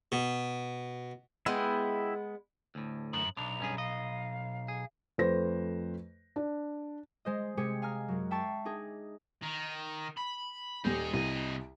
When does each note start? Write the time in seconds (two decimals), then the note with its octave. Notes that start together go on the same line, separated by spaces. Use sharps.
0.12 B2
1.46 G#3 B3 E4 G5
2.75 D2 A2
3.13 F#2 F#7
3.37 B1 D4 F7
3.60 G2 C#4 G#4
3.78 D#5 F5
4.68 G#4
5.18 F2 A3 B4 C5 A#6
6.36 D4
7.25 G#3 C5 D#5
7.57 C3 G#3 G4 G#4 C#7
7.82 F5 G#5 A#5 F6
8.08 F#2 F#3
8.31 E5 G5 A5 C#6 A6 C7
8.65 D4 D#4 G#4
9.42 D#3
10.17 B5
10.85 D#1 G3 D#4 G#4
11.13 C2 C3 D#5